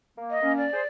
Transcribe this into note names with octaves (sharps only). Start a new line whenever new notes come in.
A#3
D#5
A#3 C#4
D5
G#4 C5